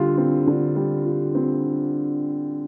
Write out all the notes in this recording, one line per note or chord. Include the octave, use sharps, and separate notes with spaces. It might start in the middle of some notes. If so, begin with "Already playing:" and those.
Already playing: D3 G3 F4
C4
D3
G3
F4
C4